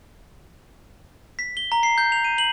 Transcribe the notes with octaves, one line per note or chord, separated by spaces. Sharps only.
B6
G7
A#5
C7
G6
F7
D#7
F#7